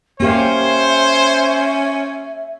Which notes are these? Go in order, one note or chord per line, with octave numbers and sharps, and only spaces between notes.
A#3 C#4 G4 C5 E5 F5